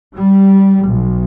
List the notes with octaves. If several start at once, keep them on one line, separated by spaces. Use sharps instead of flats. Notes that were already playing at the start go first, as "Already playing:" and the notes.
G3
B1